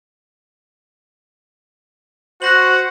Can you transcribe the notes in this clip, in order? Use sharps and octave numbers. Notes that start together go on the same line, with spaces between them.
F#4 C5 F#5 F#6 A#6 F#7